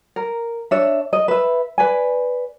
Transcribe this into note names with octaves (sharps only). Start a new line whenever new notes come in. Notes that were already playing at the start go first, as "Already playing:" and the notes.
A#4
D4 C#5 E5
D#5
B4 E5
B4 D5 G#5